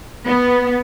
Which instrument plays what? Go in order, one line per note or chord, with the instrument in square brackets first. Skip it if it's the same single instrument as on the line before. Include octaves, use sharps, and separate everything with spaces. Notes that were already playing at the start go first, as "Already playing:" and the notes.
[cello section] B3